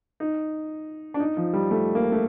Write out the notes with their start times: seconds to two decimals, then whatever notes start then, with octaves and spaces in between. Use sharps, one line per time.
0.20 D#4
1.14 D4
1.20 D#4
1.37 F3
1.53 G3
1.71 A3
1.95 A#3
2.12 A3